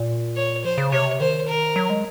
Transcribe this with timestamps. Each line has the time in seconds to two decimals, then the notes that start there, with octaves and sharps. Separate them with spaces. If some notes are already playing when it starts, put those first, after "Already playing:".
Already playing: A#2
0.36 C#5
0.64 F3 C5
0.78 C#3
0.92 C3 C#5
1.20 D#3 C5
1.48 A#4
1.76 F#3
1.90 G#3